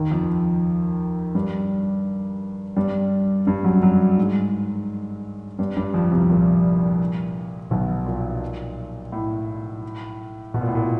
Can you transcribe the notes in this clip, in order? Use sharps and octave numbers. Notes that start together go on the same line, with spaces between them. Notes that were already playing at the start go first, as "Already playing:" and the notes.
Already playing: D#2 D#3
F2 F3
G2 G3
G2 G3
G2 G3
F#2 F#3
F#2 F#3
G#2 G#3
G2 G3
G2 G3
F2 F3
C2 C3
A#2
B1 B2
A#2
A2
B2
A#2
A2
A#2